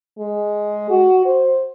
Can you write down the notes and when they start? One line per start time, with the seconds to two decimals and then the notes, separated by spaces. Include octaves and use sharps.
0.19 G#3
0.90 F#4
1.25 C5